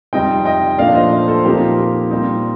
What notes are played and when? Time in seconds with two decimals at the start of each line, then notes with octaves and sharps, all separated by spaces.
0.13 F2 C3 G3 C4 D#4 D#5 G5
0.45 D#5 G5
0.78 A#2 F3 A3 D4 D5 F5
0.95 C5 D#5
1.28 A4 C5
1.44 A#2 F3 C4 D#4 G4 A#4
1.77 G4
2.10 A#2 G3 C4 D#4